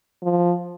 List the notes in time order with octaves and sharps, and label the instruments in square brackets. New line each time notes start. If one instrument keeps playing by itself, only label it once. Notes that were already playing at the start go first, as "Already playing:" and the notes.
[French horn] F3